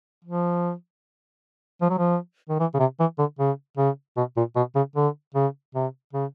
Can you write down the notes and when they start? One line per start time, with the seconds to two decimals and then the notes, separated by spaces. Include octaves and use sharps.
0.25 F3
1.82 F3
1.90 F#3
1.98 F3
2.49 D#3
2.60 E3
2.74 C#3
2.79 C3
3.00 E3
3.19 D3
3.39 C#3
3.78 C#3
4.17 B2
4.37 A#2
4.56 B2
4.75 C#3
4.96 D3
5.35 C#3
5.75 C3
6.13 C#3